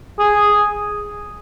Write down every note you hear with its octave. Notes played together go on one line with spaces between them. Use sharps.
G#4